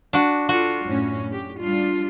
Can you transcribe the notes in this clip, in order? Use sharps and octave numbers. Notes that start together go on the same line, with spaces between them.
D4 F#4
F4 F#4 A4
F#2 A2 C#4
G4
G3 D4 F4